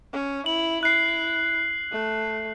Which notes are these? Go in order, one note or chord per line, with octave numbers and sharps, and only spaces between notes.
C#4
E4 F#7
E4 F#6 C7
A3